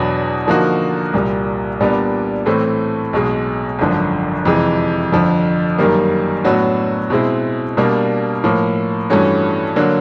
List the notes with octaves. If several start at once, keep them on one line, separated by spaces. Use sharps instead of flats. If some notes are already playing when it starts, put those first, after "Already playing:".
Already playing: E2 B2 F#3 B3 D4
D3 F3 A#3 D#4 F#4
C2 A#2 G3
A#2 G3 B3 D4
A2 E3 A3 C4
B1 B2 G#3
G#1 F#2 D3 F3
F2 C3 E3 G#3
G1 F2 D3 F3
F#2 D#3 G3 A#3
A2 F#3 B3 D4 F#4
B2 G#3 C4 E4
B2 G3 A#3 D4
A2 F3 A#3
G2 E3 A3 C#4 F#4
D3 F#3 A#3